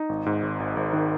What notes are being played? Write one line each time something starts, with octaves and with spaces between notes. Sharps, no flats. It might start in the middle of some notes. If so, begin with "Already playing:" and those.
Already playing: D#4
G#1
G#2
G#1
G#1
G#1
D#3